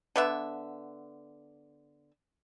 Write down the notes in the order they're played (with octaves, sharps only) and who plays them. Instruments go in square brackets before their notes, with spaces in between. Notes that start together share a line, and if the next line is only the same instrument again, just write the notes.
[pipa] D3 B3 E5